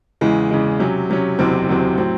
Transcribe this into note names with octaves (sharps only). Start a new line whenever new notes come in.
E2 C#3 E3 G#3
E2 C#3 E3 G#3
C3 F#3 C#4
C3 F#3 C#4
F#1 E2 C3 F#3 C4
F#1 E2 C3 F#3 C4
A2 F#3 C4